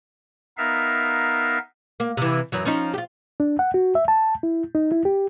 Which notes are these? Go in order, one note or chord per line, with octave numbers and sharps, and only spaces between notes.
B3 D#4 A#4 E5 F5
A#3
C3 E3
F#2 E3 F#3
F3 C#4 D#4
F4 G4
D4
F#5
F#4
E5
A5
E4
D#4
E4
G4